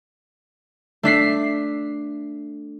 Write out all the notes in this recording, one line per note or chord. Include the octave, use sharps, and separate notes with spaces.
A3 D4 B6 C7